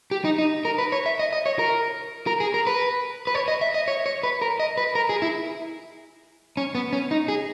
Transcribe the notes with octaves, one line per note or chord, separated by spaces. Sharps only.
G4
D#4
D#4
A#4
B4
C#5
E5
D#5
D#5
C#5
A#4
A#4
G#4
A#4
B4
B4
C#5
D#5
E5
D#5
C#5
C#5
B4
A#4
D#5
B4
A#4
G#4
E4
C#4
B3
C#4
D#4
G#4